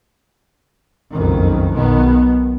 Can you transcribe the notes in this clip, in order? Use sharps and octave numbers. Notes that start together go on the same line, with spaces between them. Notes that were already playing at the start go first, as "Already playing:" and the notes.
F#1 B1 F2 D#3
B1 B2 D#3 B3